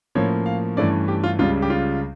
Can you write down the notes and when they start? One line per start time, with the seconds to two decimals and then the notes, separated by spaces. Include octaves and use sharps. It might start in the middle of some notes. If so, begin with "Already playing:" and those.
0.15 A2 F3 A#3 C#4 C#5
0.46 F5
0.77 G2 E3 A3 C#4 D5
1.08 G4
1.24 F4
1.39 C#2 C#3 G3 F4
1.62 G4
1.70 F4